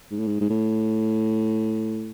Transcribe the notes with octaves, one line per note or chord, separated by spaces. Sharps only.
G#2
A2
G#2
G#2
A2